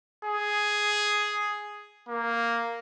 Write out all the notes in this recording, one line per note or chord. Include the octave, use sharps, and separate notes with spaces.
G#4
A#3